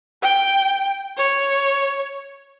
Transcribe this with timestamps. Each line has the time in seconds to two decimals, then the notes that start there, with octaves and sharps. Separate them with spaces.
0.22 G5
1.18 C#5